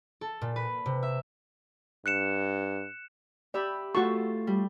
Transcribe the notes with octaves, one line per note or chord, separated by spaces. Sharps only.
A4
A#2
B4
C3
E5
G2 F#6 C#7 E7
G4 D5 E5 B5
A3 F4 F#4 A4 C#6
G3